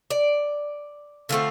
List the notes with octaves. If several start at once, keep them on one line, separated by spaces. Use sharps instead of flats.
D5
D3 A3 C4 F4